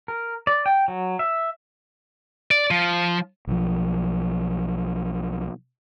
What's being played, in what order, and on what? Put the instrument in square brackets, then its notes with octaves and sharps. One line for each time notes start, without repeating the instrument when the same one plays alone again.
[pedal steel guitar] A#4
D5
G5
F#3
E5
[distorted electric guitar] D5
F3
[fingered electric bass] B1 F3